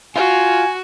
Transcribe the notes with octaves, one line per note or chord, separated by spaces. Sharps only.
F4 F#4 G#5